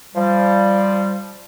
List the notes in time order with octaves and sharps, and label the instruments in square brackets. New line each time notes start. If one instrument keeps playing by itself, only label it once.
[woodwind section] F3 G3